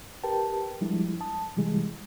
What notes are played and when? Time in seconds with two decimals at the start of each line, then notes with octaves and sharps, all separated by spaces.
0.23 G4 A#4 B4 G5 A5
0.81 F3 G3 G#3 D4 E4
1.21 A5 D#6
1.57 C3 E3 G3 G#3